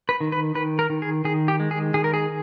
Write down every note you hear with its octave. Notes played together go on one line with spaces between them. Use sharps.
B4
D#3
B4
D#3 B4
A#4
D#3
G#4
D#3 G#4
G4
G#3
G#4
D#3 G#4
A#4
G#4